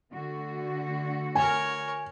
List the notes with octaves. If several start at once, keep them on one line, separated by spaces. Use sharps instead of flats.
D3 A3 F#4
A#4 C#5 G#5